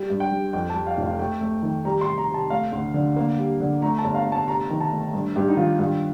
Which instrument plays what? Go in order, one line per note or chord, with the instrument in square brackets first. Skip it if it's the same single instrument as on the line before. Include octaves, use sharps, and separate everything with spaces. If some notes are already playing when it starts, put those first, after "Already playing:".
Already playing: [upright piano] G3
G2
G5
G3
F2 G5
A5
G3
F5
F1
F5
A3 G5
A3
D#3
G3 A#5
C6
C3
A#5
C3
A5
A3 F5
D2
D3
A#3
G3
D3
A3 A#5
A5
G1
F5
A3
A5
C3 A#5
D#3
A5
A3
G2
G2 G4
D#4
D#3 F4
G2 F4